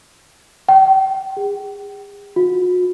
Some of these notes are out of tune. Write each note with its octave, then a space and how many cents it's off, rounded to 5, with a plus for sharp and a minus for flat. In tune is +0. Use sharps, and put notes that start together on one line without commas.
G5 -35
G#4 -45
F#4 -40